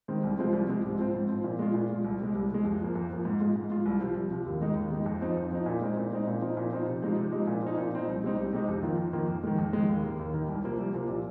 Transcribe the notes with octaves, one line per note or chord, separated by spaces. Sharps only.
D#3 G#3 C4
C2
C3 F3 G#3 C4
C2
C3 F3 G#3 C4
G#2
F3 C4
G#2
F3 C4
A#2
G#3 F4
A#2
G#3 F4
C2
C3 G#3
C2
C3 G#3
F2
F3 A#3
F2
F3 A#3
G#2
G#3 F4
G#2
G#3 F4
C2
C3 F3
C2
C3 F3
D#2
D#3 G#3 D#4
D#2
D#3 G#3 D#4
F2
F3 C4 D#4
F2
F3 C4 D#4
A#2
G#3 C4 D#4
A#2
G#3 C4 D#4
A#2
F3 C4 D#4
A#2
F3 C4 D#4
C3
F3 G#3 D#4
C3
F3 G#3 D#4
A#2
F3 C4 D#4
A#2
F3 C4 D#4
C2
C3 G#3 C4 D#4
C2
C3 G#3 C4 D#4
F2
D#3 A#3 F4
F2
D#3 A#3 F4
F2
D#3 G#3
F2
D#3 G#3
D#2
D#3 A#3
D#2
D#3 A#3
C2
C3 F3 A#3
C2
C3 F3 A#3
A#2